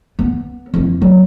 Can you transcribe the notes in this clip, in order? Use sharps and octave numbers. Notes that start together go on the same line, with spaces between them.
B3
F2 E4
F#3